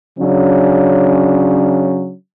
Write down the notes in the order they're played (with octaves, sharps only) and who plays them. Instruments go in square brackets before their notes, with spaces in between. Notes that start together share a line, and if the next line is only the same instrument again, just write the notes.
[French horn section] C#3 F#3 C#4 D4